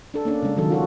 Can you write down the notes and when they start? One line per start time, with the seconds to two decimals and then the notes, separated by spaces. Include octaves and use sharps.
0.14 D4 A4
0.25 A#3 C#4 D4
0.43 C#3 G#3
0.56 D#3 F#3 A4
0.70 F4 F#4 A4